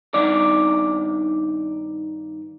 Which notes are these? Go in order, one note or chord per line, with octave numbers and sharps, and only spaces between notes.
G2 D#3 D5